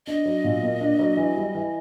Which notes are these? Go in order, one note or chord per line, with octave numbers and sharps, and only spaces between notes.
D4 D#5
F#3
A#2
A#3
D4
F#3
E3
G3
E3